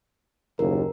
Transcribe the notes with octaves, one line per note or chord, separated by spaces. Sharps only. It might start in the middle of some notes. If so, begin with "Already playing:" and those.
F#1 D#2 A#4